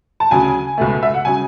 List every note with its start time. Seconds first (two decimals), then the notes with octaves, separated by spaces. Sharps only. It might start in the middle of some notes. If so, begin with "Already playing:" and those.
0.20 A5
0.31 D2 C#3 F#3 G#5
0.78 C#2 B2 A3
1.03 E5
1.14 F#5
1.25 C#3 F#3 G#5